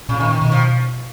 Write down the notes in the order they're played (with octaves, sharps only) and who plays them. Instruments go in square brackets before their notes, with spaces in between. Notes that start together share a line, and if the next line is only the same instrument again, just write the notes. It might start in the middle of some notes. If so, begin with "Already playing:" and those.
[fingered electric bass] A#2 [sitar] C#3
[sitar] D#3
D#3
[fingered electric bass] B2 [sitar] D#3
[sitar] F3